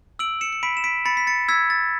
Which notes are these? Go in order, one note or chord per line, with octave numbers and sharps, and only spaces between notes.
E6 D7 F#7
C#7 E7
C#7
B5 B6 D7
E7
B6 D7
B5 A6 C#7
B6
A6 C#7
E6 G#6 B6
A6